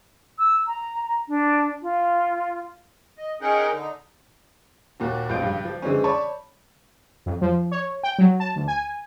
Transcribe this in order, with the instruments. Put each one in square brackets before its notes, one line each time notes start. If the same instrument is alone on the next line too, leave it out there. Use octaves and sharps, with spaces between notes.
[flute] E6
A#5
D4
F4
[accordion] D#5
C#4 D#4 G#4 A#4 F#5 G5
D3 D#4
[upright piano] D#2 A#2 F#4
A1 F3 F4 G6 D7
C#2 G2
F3
D3 E3 G#3 C4 C#4
C#5 D5 A5 B5 C#6
[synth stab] F2
F3
C#5
G5
F#3
A5
D2
G#5